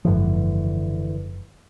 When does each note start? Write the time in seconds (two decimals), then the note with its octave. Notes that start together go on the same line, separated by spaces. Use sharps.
0.05 F#1 G#2 D3 E3 F3